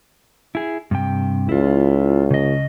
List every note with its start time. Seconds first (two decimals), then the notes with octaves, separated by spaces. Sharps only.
0.55 E4 G#4
0.91 G2 C3 G5
1.49 C#2 E4 F4
2.31 C#3 D#5